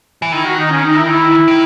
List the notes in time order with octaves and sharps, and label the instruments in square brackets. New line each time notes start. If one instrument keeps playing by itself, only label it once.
[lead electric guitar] E3
[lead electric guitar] D#3 [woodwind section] E4
[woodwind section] F#4
D#4
C#4
D#4
E4
E4
[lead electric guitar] D#3